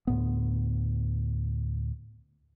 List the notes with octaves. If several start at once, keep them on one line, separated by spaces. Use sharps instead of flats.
D2 A2 B3